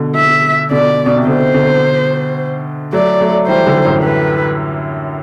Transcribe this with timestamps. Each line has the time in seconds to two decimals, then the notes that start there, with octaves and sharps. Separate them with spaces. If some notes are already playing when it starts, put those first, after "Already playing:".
Already playing: B2 D3
0.16 E5
0.71 B2 D3 D5
1.06 B2
1.17 C3
1.27 B2 D3 C5
1.54 B2 D3
2.93 F#3 A3 D5
3.20 F#3 A3
3.48 E3 G3 C5
3.67 D3 F#3
3.84 F#2 A2
4.04 B4